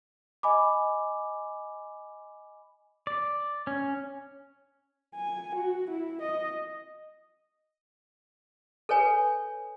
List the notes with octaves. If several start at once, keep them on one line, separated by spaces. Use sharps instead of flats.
D#5 G#5 B5 D6
D5
C#4
G#5
F#4
E4
D#5
A4 B4 C#5 G#5